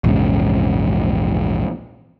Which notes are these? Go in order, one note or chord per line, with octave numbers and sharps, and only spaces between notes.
A#1 E2 G#2 C#3